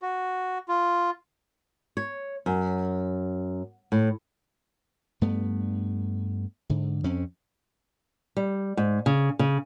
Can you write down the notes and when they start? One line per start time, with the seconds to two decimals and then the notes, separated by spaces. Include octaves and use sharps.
0.02 F#4
0.68 F4
1.97 C#5
2.46 F#2
3.92 A2
5.21 G2 A3 B3
6.70 G#2 D3
7.04 F2 C4 C#4
8.37 G3
8.77 G#2
9.06 C#3
9.39 C#3